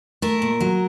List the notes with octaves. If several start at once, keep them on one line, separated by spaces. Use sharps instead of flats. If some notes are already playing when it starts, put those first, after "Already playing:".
A3 A#4
A#2
F#3